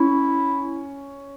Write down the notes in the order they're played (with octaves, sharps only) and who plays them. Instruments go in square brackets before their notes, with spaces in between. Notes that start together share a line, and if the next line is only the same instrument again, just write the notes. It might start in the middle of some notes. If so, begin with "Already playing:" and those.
Already playing: [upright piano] C#4 [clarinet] E4